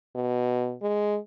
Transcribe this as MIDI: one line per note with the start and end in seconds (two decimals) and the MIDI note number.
0.15 0.74 47
0.82 1.18 56